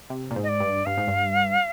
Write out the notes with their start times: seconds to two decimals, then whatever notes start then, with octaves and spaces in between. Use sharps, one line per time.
0.10 C3
0.31 A#2
0.36 G#2
0.43 D#5
0.49 D5
0.60 G2
0.86 G2 F5
0.97 G#2
1.07 G2